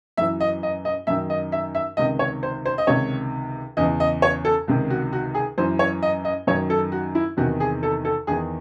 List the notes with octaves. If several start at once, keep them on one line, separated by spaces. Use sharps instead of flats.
F#2 E3 E5
D#5
D#5
D#5
F#2 D#3 E5
D#5
E5
E5
C#2 C3 D#3 D#5
C#5
C5
C5
D#5
C#2 C3 D#3 C#5
E2 C#3 E3 D#5
D#5
C#5
A4
C#2 C3 D#3
F#4
F#4
G#4
F#2 E3 C5
C#5
D#5
D#5
F#2 D#3 C#5
A4
F#4
E4
E2 C3 D#3 F#4
G#4
A4
A4
E2 D#3 G#4